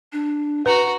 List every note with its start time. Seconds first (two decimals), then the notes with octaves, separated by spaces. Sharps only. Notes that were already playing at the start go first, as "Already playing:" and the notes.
0.13 D4
0.66 F#4 B4 F#5 A#5